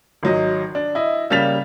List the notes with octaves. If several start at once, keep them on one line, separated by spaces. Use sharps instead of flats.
G#1 F#3 D#5
D4
E4 D#5
C#3 G3 A#3 A6 B6 F7